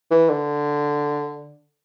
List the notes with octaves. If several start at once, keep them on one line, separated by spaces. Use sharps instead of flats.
E3
D3